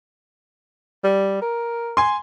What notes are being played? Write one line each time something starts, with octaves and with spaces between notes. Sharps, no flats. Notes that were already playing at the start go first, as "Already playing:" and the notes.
G3
A#4
G#5 C6